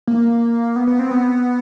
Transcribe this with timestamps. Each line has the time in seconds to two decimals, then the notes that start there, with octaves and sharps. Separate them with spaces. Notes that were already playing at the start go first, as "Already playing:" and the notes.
0.07 A#3
0.76 B3
0.87 B3
0.99 C4
1.11 B3